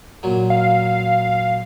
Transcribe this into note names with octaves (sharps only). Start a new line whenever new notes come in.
A#2 F#3
F5